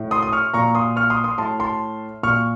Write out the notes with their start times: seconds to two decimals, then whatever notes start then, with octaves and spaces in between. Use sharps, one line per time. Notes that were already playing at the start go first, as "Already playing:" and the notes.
Already playing: A2
0.11 C6 D#6
0.23 D#6
0.33 C#6 F6
0.54 A#2 A#5 C#6
0.75 C6 D#6
0.96 C#6 F6
1.10 C6 D#6
1.24 C6 D#6
1.38 A2 A5 C6
1.60 A5 C6
2.23 A#2 C#6 F6